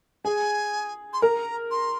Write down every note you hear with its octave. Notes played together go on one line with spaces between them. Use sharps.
G#4 G#5
C6
A#4 A#5
C6